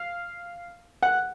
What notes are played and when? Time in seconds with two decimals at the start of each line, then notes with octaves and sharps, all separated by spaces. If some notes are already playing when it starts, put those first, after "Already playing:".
Already playing: F5
1.03 F#5